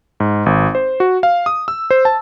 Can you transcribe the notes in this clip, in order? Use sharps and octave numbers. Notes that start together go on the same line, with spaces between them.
G#2
G#1
C5
F#4
F5
D#6
E6
C5
A5